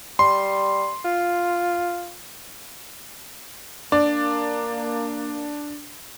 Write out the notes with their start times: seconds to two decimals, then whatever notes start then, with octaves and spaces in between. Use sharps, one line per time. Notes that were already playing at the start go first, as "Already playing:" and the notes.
0.19 G3 C6
1.05 F4
3.92 A#3 D4 D5